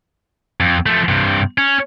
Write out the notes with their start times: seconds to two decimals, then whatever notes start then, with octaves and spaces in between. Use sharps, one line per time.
0.60 F2
0.86 F3 A3
1.09 G2 C3
1.58 C#4